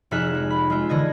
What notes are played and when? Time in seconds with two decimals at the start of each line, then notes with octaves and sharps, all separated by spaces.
0.11 F1 D#4 G#4 E5 F6 F#6
0.35 G#3
0.50 B5
0.70 G#3 F4 E5
0.89 D3 E3 D#5 G#6